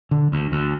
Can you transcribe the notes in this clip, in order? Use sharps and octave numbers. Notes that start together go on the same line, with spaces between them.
D3
D2
D2